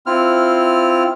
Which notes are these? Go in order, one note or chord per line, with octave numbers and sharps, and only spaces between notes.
C4 E4 F4 F6